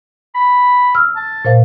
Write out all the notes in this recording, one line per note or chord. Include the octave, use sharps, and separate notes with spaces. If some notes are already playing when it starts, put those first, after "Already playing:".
B5
E6 F6
A5
A#2 C5 F5